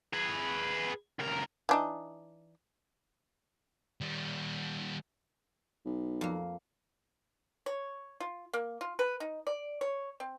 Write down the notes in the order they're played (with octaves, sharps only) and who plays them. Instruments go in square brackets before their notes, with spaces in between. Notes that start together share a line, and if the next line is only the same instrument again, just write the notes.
[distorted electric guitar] G#4 B4
C#2 A#4
[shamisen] E3 D4 D#4
[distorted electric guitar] D#3 G3
[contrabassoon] B1
[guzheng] F2 A#3
[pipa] C#5
F4
A#3
F4
B4
D#4
D5
C#5
C4